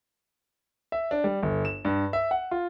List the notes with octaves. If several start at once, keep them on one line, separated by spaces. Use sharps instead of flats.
E5
D4
G3
G1
E7
G2
E5
F#5
F4